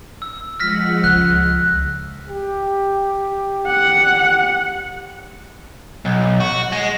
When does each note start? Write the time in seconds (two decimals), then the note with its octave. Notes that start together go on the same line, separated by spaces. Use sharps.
0.22 E6
0.60 F3 G#3 F#5 F6 A#6 B6
1.04 C#2 F#6
2.28 G4
3.67 F#5
6.05 B1
6.40 F#4
6.72 G#3